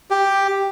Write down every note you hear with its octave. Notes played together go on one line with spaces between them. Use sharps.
G4